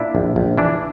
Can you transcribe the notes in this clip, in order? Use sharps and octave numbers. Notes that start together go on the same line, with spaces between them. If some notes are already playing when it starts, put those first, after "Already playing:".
Already playing: A#2 D4 E4
A#1
A#1
E3 D4